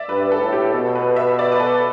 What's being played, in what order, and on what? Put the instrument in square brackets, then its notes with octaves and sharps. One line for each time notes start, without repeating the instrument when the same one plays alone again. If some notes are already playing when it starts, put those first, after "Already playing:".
Already playing: [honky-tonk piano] D5 E5
[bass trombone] G2 [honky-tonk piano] B4
[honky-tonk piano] A4
[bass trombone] A2
[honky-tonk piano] G4
[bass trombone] B2 [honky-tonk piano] A4
[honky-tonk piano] B4
E5
D5
B4
A4